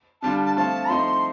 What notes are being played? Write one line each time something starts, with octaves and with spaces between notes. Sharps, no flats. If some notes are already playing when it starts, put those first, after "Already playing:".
D3 G3 D4 F4 A5
A5
F3 A3 C4 F4 A5
F3 A3 C4 D#4 C6